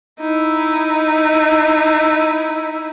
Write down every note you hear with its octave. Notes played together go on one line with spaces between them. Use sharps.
D#4 E4